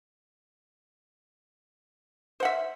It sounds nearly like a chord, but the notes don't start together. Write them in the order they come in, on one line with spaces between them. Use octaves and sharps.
C5 F#5 E5